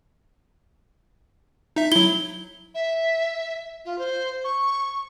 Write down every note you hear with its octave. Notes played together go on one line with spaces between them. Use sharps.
D#4 E5
F#3 E4 G7
E5
F4
C5
C#6